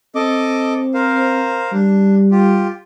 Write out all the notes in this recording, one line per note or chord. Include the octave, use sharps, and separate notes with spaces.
C4 A4 D#5 D6
A#4 C5 F5
G3 D4
F4 G4